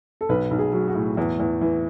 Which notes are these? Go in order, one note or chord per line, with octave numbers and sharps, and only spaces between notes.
A4
B1 B4
B1
G#4
F#3
F#4
A2
E2
E2
E3